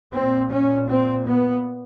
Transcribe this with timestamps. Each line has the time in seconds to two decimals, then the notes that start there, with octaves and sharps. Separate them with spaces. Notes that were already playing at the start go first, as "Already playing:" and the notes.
0.13 A#2 C4
0.51 C#4
0.88 C4
1.26 B3